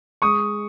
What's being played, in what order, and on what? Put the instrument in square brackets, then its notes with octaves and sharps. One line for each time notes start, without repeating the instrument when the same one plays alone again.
[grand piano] G#3 C#6 D#6